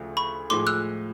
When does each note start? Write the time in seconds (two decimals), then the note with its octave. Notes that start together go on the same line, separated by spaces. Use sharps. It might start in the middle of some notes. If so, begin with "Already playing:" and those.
Already playing: D2 C#3 F3 A3
0.17 B5 C#6
0.50 A2 F3 G#3 C6 D6
0.67 E6 F#6